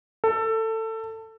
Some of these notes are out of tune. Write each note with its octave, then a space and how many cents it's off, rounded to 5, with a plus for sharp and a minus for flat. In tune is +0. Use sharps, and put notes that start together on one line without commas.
A4 +20